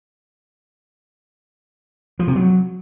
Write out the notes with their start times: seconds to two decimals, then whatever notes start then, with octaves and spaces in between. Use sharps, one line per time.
2.19 F3
2.28 C3
2.36 F#3